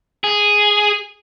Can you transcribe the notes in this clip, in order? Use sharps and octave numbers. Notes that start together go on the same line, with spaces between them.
G#4